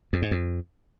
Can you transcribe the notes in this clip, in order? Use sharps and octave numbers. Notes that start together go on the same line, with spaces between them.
F2
G#2
F2